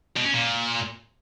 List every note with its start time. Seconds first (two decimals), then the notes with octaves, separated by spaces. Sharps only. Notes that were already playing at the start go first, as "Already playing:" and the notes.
0.16 B2
0.25 C#4
0.33 A#2